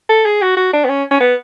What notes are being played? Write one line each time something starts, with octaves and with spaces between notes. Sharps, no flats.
A4
G#4
F#4
F#4
D4
B3
C#4
C#4
B3